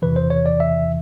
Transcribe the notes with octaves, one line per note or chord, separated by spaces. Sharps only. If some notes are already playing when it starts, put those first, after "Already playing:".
E2 C3 E3 B4
C5
C#5
D5
E5